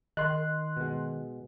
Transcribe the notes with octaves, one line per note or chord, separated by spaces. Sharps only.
D#3 D#5 C6 F#6
B2 G#3